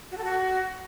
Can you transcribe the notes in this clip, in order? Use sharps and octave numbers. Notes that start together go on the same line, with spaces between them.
F#4
A4
F#4